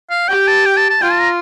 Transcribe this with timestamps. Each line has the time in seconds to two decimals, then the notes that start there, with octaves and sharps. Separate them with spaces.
0.10 F5
0.28 G4 G5
0.47 A5
0.66 G5
0.77 A5
0.90 A5
1.01 F4 G5
1.11 A5
1.21 A#5